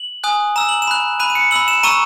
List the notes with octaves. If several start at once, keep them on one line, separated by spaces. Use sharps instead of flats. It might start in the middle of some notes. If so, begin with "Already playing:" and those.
Already playing: F#7
G#5 D#6 F#6
A#5 E6 E7
F#7
E7
B5 F#6
B5 F#6 D#7
D#7
C#7
B5 E6 F#7
E7
A#5 C#6 E6 D#7